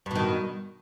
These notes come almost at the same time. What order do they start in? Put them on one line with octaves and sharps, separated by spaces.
G2 B2 D#3